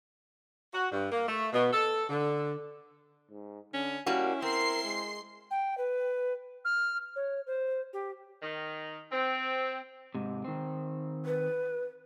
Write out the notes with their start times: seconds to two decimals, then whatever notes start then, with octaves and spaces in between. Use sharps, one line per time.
0.74 F#4
0.92 G2
1.11 A#3
1.28 A3
1.53 B2
1.73 A4
2.10 D3
3.30 G#2
3.74 D3 C#4
4.06 G3 A#3 C#4 E4 F#4
4.42 C4 A#4 C6 C7
4.84 G#3
5.51 G5
5.78 B4
6.65 F6
7.16 C#5
7.47 C5
7.93 G4
8.43 D#3
9.12 C4
10.15 G#2 C3
10.45 D#3 C4
11.26 B4